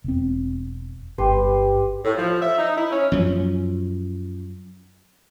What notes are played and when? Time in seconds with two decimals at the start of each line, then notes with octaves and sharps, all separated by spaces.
0.04 E1 C4
1.18 G1 G4 B4 C6
2.05 A2
2.17 F3
2.41 E5
2.58 D#4
2.76 E4
2.91 C#4
3.12 F#2 F3